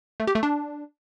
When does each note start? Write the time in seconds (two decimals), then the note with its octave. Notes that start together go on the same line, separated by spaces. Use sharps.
0.20 A3
0.27 G4
0.35 A3
0.43 D4